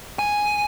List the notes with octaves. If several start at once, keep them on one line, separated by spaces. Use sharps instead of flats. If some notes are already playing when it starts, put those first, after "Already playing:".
G#5